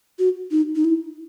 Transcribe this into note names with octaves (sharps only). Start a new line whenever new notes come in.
F#4
D#4
D#4
E4